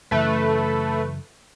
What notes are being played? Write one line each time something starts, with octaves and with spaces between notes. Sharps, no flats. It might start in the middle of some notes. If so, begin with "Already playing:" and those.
F#2 C#3 E3 A3 B4